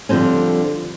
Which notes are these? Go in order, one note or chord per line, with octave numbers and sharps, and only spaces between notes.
D3 F3 G3 C4 C#4